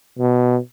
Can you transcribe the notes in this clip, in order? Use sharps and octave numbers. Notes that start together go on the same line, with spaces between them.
B2